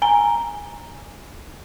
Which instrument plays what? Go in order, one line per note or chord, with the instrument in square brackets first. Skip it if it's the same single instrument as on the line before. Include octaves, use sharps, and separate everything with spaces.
[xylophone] G#5 A#5 G7